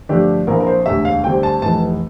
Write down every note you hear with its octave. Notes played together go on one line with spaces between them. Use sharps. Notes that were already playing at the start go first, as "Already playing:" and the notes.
G2 D3 F3 A3 D4 G4
A#1 A#2 F3 C4 E4 A#4
A#4
C5
E1 D2 C3 E5
F5
D2 D3 G3 C4 G5
A5
F1 F2 E3 A5